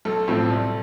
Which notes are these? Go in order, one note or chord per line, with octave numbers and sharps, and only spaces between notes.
B1 A4
A2 F3 A3 C4
C2